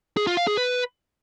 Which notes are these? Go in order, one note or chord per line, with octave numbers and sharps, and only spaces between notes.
G#4
F4
F5
G#4
B4